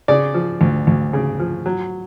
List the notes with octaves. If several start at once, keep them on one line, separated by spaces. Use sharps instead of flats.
C#3 D5
F3
D2
D2
C#3
F3
F#3